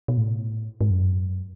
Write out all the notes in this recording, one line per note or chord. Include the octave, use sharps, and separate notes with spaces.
B2
A2
G#2
F#2